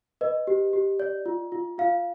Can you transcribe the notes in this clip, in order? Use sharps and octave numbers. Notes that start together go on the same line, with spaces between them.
B4 D#5
G4
G4
D5
F4
F4
F4 F5